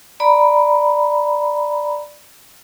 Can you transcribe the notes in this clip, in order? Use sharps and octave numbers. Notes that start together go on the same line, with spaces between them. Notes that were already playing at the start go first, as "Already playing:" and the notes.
D5 A#5 B5